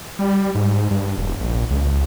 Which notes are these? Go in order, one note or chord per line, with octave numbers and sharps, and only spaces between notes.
G3
G#2
G2
E1
A#1
C#2